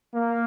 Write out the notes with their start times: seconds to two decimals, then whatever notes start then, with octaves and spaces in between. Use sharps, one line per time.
0.14 A#3